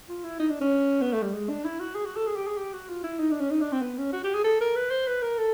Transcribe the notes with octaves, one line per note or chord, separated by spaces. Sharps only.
F4
E4
D#4
D4
C#4
B3
A3
G3
G#3
D4
E4
F#4
G#4
F#4
A4
G#4
G4
G#4
G4
F#4
F4
E4
D#4
D4
C#4
D#4
D4
C4
B3
C#4
F#4
G4
G#4
A4
A#4
B4
C5
B4
A#4
A4